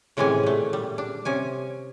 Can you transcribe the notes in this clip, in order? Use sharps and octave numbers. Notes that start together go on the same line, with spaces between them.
A2 C3 E3 G#3 C#4 G#5
A#2 A3
G3
D4
C3 C#4 G#5